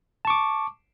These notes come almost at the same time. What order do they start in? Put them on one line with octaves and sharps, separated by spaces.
A5 C#6 D6